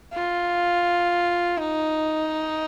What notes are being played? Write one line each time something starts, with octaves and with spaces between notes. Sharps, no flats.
F4
D#4